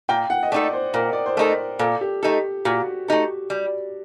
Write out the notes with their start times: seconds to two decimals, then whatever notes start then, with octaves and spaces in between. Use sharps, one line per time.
0.09 A#2 G5
0.30 F#5
0.43 D#5
0.52 A3 D#4 A4 D5
0.73 C5
0.94 A#2 A#4
1.13 D5
1.26 C5
1.37 A3 D#4 A4 A#4
1.79 A#2 A4
2.01 G4
2.23 A3 D#4 G4 A4
2.65 A#2 F#4
3.08 A3 D#4 G4 A4
3.50 G3